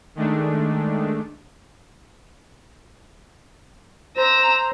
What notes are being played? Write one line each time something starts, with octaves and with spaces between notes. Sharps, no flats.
D#3 G#3 A3 D4
C5 A#5 E6